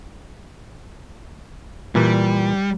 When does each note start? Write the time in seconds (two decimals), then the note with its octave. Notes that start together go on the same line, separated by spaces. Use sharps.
1.95 A#2 E3 G3